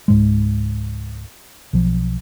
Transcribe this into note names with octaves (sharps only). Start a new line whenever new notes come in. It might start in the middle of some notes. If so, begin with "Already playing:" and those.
C#2 G#2 G#3
B1 F3